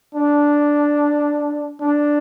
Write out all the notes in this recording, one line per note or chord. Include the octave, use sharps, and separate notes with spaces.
D4
D4